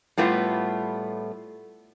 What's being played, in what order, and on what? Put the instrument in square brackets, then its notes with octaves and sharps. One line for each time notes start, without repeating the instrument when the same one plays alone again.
[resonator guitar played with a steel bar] A2 G3 A3 B3 F4